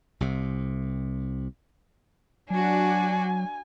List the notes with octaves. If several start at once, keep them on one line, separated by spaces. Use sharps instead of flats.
C2 C3
F#3 D4 F#4 G#5